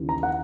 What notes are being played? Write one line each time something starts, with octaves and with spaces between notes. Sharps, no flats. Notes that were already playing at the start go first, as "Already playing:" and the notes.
Already playing: D#2 C#3 E3
A#5
F#5